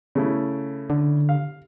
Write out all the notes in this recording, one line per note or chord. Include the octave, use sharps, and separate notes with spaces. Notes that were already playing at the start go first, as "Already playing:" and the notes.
C#3 A3 E4
D3
F5